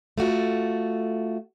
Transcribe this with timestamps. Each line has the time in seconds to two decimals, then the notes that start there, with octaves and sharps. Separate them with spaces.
0.18 A3 F4 F#4